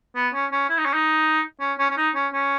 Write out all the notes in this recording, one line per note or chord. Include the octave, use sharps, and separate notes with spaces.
B3
C#4
C#4
E4
D#4
C#4
D#4
C#4
C#4
C#4
D#4
C#4
C#4